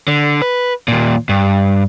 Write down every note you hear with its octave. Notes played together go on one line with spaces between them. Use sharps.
D3
B4
D#2 A#2
G2